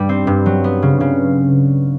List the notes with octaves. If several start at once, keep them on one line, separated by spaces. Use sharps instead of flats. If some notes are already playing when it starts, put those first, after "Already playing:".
Already playing: G2 G3
C4
G2
F#3
B3
C#3
C#3